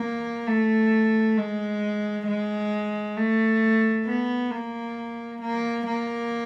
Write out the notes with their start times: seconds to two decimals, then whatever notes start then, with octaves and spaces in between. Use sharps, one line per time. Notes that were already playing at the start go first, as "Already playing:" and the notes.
Already playing: A#3
0.48 A3
1.37 G#3
2.27 G#3
3.17 A3
4.06 B3
4.51 A#3
5.41 A#3
5.86 A#3